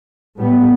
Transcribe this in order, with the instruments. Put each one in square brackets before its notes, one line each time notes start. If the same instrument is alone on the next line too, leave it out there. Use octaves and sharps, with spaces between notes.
[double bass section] A2 G3 B3